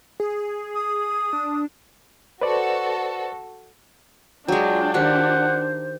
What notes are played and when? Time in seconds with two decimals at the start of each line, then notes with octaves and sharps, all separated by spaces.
0.20 G#4
0.75 D#6
1.33 D4
2.41 F#4 A4 B4 C5 D5
4.48 F#3 G#3 D4 F4 G5
4.94 D#3 G4 C5 F#5